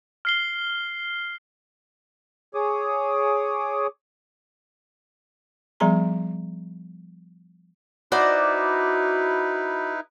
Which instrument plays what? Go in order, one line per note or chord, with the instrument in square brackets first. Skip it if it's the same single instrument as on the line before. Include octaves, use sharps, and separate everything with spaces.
[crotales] F6 C7 G7
[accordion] G#4 C#5 D6 D#6
[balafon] F3 G3 B3 G#4 A#5 C6
[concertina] D#4 E4 B4 [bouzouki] F#4 C5 D5